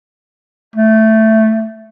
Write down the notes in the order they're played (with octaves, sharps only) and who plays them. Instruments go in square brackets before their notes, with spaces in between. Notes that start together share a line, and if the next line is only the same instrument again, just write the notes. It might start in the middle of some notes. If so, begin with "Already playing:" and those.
[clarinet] A3